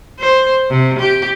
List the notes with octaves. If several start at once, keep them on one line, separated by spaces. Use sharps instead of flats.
C5
C3
G4